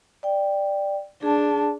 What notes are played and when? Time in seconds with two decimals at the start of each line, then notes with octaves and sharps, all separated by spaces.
0.23 D5 G5
1.23 D4 G#4 A5